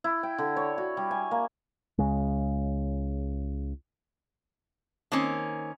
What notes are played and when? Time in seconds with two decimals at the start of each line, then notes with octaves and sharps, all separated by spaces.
0.04 E4
0.23 G5
0.38 D3
0.57 C#5
0.78 F#4
0.97 G3
1.11 G#5
1.31 A#3
1.98 C#2 C#3 G#3
5.12 D#3 A#3 C4 C#4